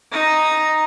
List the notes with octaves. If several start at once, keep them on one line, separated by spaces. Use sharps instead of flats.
D#4 A#5